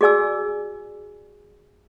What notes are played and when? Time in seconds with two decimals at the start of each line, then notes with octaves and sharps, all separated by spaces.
0.01 F#4 G#4 D5 G#5 E6